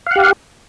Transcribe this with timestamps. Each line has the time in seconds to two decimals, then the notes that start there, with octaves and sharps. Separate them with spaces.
0.07 F5
0.11 F#5
0.16 G4